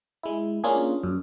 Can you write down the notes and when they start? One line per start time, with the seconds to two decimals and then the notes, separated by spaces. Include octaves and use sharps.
0.23 G#3 E4
0.64 A#3 C#4 D4 F4 G#4
1.03 F#2